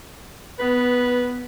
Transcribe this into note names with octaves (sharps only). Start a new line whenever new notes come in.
B3 B4